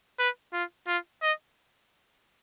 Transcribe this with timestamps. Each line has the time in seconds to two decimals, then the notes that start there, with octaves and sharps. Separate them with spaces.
0.19 B4
0.53 F4
0.87 F4
1.22 D#5